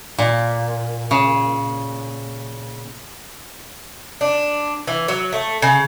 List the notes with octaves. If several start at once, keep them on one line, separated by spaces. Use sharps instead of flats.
A#2
C#3
D4
E3
F#3
A3
C#3